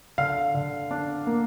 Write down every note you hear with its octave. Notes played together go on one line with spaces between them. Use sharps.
D3 F5
D3
D4
A#3